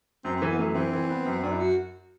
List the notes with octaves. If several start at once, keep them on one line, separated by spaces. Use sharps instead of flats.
F#2 C4
C4
E3
B3
F#2 A3
E3 C4
E3
B3
F#2
F#2 D4
E4
F#4